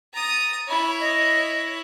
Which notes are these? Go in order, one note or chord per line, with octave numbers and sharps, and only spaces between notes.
A#5 D#6 A6
E4 C#5 B5
D#5